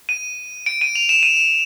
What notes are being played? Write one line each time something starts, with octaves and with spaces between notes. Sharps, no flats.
D#7
D7
D#7
F7
E7
D#7
E7